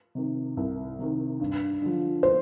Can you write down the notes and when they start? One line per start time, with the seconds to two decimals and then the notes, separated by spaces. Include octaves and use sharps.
0.15 C3 D#3
0.57 C2
0.99 C3 D#3
1.40 G2
1.82 D3 F3
2.23 C5